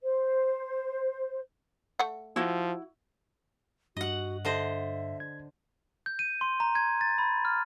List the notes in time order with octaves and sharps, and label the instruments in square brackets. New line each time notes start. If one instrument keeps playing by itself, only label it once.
[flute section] C5
[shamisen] A3 F#5
[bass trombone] F3 [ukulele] E4 F#4
[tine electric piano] G2 [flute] F#4 [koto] D#5 F#5
[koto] D3 C5 D#5 [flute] E5
[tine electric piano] G#6
[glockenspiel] G6
D#7
C6
A#5
G#6
A6
B5
F6